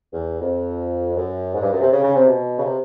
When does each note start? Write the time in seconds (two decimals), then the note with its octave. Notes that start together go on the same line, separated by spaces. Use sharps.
0.12 E2
0.41 F2
1.16 F#2
1.53 G#2
1.62 G2
1.72 F#2
1.81 C3
1.90 C#3
2.03 C#3
2.15 C3
2.27 B2
2.59 C#3
2.64 C3